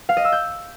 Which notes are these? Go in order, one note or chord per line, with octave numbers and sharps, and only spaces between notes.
F5
D#5
E6
G6